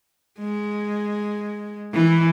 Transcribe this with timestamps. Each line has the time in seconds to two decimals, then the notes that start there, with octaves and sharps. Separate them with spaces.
0.39 G#3
1.94 E3